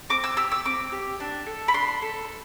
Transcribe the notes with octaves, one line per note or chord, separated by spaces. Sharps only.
C4 D6
E6
G4 E6
E6
C4 D6
G4
D4
A4
B5
D4 C6
A4